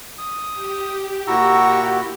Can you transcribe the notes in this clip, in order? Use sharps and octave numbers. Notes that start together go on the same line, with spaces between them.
D#6
G4
A#2 E4 F#4 F#5 A#5 C#6 E6